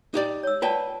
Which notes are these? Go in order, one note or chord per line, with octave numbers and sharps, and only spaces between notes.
D#4 G4 D5
C#5 E6
F4 B4 D5 F#5 G5 A5